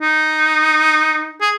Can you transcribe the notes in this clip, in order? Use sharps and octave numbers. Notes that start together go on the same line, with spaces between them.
D#4
G#4